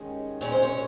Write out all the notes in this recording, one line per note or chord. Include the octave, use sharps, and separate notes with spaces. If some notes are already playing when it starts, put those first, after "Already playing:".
Already playing: D#2 D#3 G#3 C#4
A#2 G#3 C#4 C#5
C5
C#5